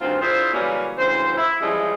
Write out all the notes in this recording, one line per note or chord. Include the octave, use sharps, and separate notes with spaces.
D2 G2 D#3 C4 F4
D4 E4 F4 G#4 C5
C#3 E3 F#3 G3 A#3 C#4
D2 C#3 E3 C5
E4
E3 F3 G3 G#3 C#4 E4